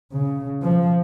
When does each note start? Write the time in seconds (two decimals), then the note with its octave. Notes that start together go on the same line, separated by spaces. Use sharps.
0.12 C#3
0.63 F3